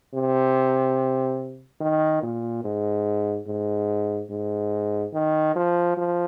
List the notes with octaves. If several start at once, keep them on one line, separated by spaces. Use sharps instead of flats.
C3
D#3
A#2
G#2
G#2
G#2
D#3
F3
F3